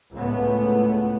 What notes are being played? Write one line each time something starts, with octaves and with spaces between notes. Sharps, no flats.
C#2 A2 A3 B3